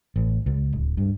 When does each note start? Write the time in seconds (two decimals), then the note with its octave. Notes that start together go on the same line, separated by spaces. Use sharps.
0.16 A1
0.46 C#2
0.73 D1
0.97 G2